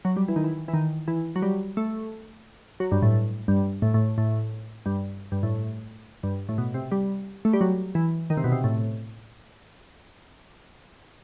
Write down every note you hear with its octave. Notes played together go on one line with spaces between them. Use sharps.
F#3
G3
E3
D#3
E3
E3
D#3
E3
F#3
G3
A3
F#3
G2
A2
G2
A2
A2
A2
G2
G2
A2
G2
A2
B2
C3
G3
A3
G3
F#3
E3
D#3
C3
B2
C3
A2